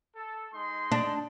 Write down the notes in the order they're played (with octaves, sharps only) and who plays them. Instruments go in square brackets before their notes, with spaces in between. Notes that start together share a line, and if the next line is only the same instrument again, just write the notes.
[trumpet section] A4
G#3 D#4 C6
[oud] D4